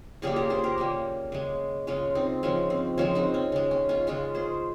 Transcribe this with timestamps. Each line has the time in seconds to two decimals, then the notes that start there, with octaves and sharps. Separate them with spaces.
0.22 C#3 G3 A#3 F4 G#4
0.36 G4 A#4
0.50 G#4 C5
0.64 G4 A#4
0.78 C#3 G3 A#3
1.32 C#3 G#3
1.87 C#3 G#3 C#4 F4
2.15 C4 D#4
2.43 C#3 F3 G#3 C#4
2.70 C4
2.98 C#3 F3 G#3 C#4
3.15 C4 D#4
3.34 C#4
3.52 C#3 G#3
3.71 C#4
3.89 C#4 F4
4.07 C#3 G#3 C#4 F4
4.35 G#4 C5